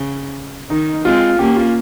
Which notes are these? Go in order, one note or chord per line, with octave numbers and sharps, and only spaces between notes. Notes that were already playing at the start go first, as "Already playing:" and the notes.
Already playing: C#3
D#3 D#4
G#3 C4 F4
A#3 C#4 G4
F4